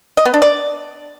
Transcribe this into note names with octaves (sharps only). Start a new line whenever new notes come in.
D#5
B3
D4
D5